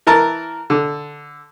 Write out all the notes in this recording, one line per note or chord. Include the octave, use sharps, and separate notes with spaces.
E3 A#4 A5
D3